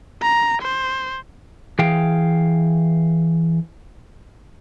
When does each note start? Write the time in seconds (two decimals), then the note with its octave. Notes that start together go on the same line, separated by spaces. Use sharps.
0.22 A#5
0.62 C5
1.79 E3 G#4 F5 G5